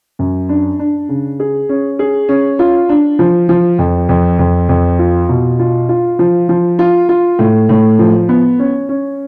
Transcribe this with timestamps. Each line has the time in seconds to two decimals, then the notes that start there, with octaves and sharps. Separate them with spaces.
0.19 F#2
0.49 D4
0.79 D4
1.09 C#3
1.40 G#4
1.69 C#4
1.99 G#4
2.29 C#4
2.59 F4
2.89 D4
3.19 F3
3.49 F3
3.79 F2
4.09 F2
4.39 F2
4.69 F2
4.99 F4
5.29 B2
5.59 F4
5.89 F4
6.19 F3
6.49 F3
6.79 F4
7.09 F4
7.39 A2
7.69 A2
7.99 F3
8.29 B3
8.59 C#4
8.89 C#4